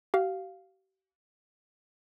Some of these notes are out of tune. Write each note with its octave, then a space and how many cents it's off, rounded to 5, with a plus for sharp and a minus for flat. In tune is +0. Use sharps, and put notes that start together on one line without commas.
G4 -45 F5 +0